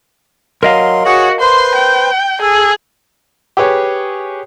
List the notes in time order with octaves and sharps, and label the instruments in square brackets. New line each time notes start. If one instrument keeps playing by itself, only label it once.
[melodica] F#3 C6 [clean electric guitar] A#4 D#5 F5
[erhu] F#4 [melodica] G#4 C#5 F#5
[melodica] B4 C5 [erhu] C6
[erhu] G5
[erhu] G#4 [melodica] A4
[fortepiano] G4 G#4 B4 C#5